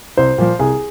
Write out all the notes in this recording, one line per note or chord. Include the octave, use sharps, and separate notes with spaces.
C2 C5
A#2 F3
C2 G#4